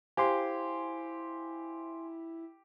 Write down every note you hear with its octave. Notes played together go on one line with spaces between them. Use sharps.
E4 G4 C5 F5 G#5 C6